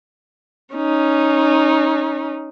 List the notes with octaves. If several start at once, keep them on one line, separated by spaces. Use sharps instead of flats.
C#4 D#4